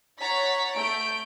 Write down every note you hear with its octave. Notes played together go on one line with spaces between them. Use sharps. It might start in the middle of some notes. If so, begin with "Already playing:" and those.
C#5 F#5 A#5 A6 B6
A3 G6 D7